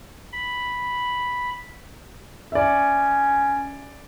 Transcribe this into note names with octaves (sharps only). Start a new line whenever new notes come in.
B5
C#4 D5 E5